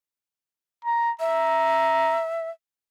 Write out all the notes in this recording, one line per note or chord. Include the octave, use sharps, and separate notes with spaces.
A#5
E5 A#5